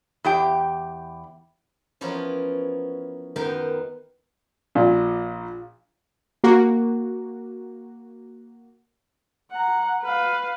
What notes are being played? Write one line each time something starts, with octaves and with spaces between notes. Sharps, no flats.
E2 G4 G5
E3 F3 B3 C#4 F4 A#4
F#2 D#3 B3 A#4 B4 G5
A#1 A#2
A#3 F#4
F#5 A#5
B4 F5